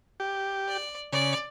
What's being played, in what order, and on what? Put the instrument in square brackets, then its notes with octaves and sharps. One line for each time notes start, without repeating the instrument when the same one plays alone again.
[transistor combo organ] G4
[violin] D5
[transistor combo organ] C#3 [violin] D5